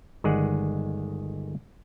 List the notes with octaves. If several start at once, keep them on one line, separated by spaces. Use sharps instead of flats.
G1 D#3 G#3 G#4 D5 F#5